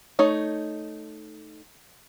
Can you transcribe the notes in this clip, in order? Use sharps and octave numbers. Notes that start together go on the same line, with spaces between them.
A3 D#4 C#5